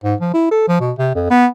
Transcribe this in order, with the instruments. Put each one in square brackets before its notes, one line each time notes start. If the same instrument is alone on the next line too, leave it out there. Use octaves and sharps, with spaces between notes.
[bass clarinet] G#2
F3
E4
A4
F3
B2
C3
F2
B3